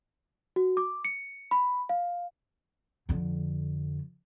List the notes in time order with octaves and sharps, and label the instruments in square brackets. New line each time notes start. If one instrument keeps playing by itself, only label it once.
[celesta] F#4
D6
C#7
B5
F5
[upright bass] F2 D3